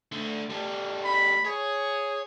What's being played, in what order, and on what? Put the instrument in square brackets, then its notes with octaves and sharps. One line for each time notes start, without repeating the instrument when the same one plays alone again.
[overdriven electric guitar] D3 A3
G3 A3
[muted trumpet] B5
[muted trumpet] G#4 [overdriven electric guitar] C#5